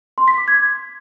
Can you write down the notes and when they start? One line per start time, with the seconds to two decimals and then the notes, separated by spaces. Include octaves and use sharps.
0.18 C6
0.28 B6
0.38 D6
0.48 G#6